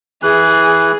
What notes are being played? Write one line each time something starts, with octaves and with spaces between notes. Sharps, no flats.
E3 G#4 F#6